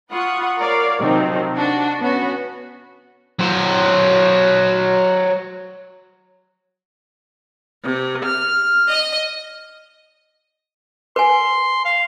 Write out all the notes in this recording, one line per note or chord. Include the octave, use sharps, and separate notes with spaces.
F4 F#5 B5 C#6 D#6
A#4 C#5 D5 F5
C3 D#3 F3 F#3 C4 D#4
D4 F#4
B3 C#4 F#4
F#3 C5
C3
F6
D#5
B4 G#5 C6
F5